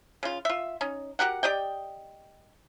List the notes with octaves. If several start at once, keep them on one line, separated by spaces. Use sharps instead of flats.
C#3 F4
F4 E5
C#4 D#4
F#4 G4 A#4 F#5
G4 D5 D#5 G5